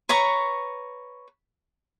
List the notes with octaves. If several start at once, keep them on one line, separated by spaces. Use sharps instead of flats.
B4 C#5 A#5 C#6